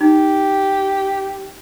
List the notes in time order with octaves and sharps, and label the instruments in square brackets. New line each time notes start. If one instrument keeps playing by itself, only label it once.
[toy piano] D#4 [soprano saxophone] G4